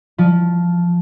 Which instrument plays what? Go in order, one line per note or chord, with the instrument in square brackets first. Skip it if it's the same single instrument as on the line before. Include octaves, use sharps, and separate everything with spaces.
[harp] F3